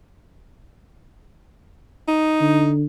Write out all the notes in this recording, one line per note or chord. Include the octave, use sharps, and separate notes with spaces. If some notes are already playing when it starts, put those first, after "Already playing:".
D#4
D3